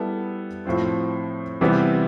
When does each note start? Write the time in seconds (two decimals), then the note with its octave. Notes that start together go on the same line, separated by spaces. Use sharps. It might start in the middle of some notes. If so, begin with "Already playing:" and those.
Already playing: G3 B3 E4 A4
0.65 A2 F3 C4 F4
1.61 C3 E3 G3 B3